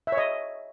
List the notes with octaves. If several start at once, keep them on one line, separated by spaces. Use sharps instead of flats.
E5
C#5
D#5